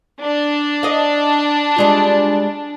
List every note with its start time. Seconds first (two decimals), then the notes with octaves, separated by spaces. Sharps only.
0.22 D4
0.83 D#5 F5
1.76 G3 G#3 F4